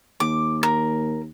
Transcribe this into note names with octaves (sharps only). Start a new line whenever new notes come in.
D#2 D6
A#4